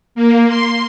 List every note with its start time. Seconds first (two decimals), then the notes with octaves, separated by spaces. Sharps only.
0.15 A#3
0.48 C6